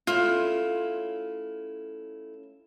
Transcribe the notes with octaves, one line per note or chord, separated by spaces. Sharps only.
A3 C#4 E4 F4